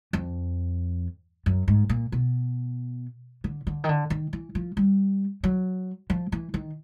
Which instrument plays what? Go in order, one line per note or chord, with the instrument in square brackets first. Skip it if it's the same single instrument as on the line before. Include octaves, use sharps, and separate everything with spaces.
[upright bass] F2
F#2
G#2
A#2
B2
D3
D3
D#3
D3
D#3
E3
F3
G3
F#3
F3
E3
D#3